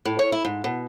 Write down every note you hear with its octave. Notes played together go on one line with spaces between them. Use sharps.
A2
C#5
E4
G#2
B2